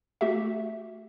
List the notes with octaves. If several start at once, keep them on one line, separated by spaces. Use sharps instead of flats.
A3 F#4 G4 E5